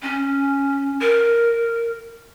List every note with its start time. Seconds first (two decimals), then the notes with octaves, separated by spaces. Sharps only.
0.03 C#4
1.01 A#4